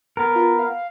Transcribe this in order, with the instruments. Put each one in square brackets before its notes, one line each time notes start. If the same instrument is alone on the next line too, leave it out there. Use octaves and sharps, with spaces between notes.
[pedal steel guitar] B3 A#4
[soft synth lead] F4
F5